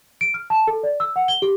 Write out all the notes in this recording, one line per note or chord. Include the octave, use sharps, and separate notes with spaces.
D7
F6
A5
A4
D5
E6
F#5
G7
G4